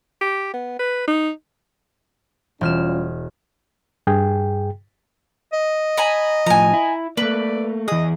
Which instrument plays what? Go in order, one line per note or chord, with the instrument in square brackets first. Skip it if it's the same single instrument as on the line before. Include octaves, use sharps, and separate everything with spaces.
[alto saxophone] G4
B3
B4
D#4
[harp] E1 F6 E7 [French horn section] G3 C#4 F4
[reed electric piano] G2 G#4 G5
[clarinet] D#5
[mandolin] G#5 A#5 B5
[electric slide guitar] A2 F3 [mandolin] G#5 A#5
[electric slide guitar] E4
[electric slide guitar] A3 A#3 [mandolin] B4 [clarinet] D5
[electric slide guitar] E3 G#4 [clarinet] D#5 [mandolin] D#6